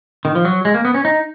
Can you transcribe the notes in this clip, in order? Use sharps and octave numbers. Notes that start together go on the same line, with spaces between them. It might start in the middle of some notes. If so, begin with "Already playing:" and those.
D#3
F3
F#3
G#3
A#3
B3
C#4
D#4